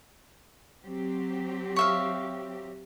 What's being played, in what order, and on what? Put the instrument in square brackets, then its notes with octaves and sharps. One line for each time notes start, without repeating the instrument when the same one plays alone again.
[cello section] F#3 C4 G4
[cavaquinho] C#5 E5 F5